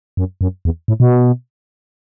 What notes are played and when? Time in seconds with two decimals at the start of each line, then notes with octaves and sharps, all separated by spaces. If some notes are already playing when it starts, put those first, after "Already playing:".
0.17 F#2
0.41 F#2
0.65 E2
0.88 A2
1.00 B2